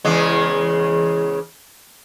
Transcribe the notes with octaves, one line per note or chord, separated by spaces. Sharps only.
E2 C#3 G#3